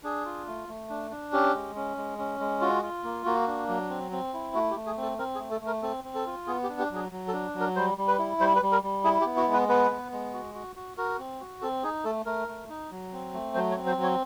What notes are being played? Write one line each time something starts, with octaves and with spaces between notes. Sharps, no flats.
D4 G#4
F4
A3
A3
D4
D4
C#4 G4
G#3
C#4
G#3
C#4
G#3
F4 F#4
F4
A#3
A#3 F#4
D4
F#3
C4
C4
E4
A3 F#4
G4
A3
G#4
C4
A4
C4 A#4
G#4
A3
A4
A3
A#4
C4 A4
C4
A4
F4
B3 G#4
G4
D4
G4
F#3 G#4
F#3
A4
D4
F#3
A#4
G3 C5
G3
B4
E4
G3 C5
B4
G3
A#4
G3
E4 G#4
G4
B3
F#4
G#3
B4
B3 B4
B3
G#3
F#4
F#4
F#4
F#4 A#4
C4
F#4
C4 A4
D#4 G#4
A3 A4
A3 A#4
A3
D#4
F#3
C4
A3
F#3 C5
C#5
C4
C5
F#3
C#5